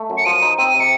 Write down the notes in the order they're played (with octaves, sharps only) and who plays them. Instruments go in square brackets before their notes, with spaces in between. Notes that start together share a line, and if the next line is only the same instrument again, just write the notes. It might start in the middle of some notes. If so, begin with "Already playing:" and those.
Already playing: [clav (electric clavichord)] A3
F#2
[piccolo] C#7
[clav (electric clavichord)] F3 [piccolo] D#7
[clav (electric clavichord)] D#4
[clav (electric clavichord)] C4 [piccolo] D#7
[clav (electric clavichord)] C3
[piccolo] C#7